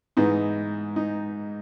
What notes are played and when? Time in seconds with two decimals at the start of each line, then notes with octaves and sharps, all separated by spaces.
0.17 G#2 E3 B3 D#4
0.96 D#4